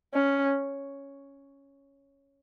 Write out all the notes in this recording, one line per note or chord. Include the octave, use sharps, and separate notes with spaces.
C#4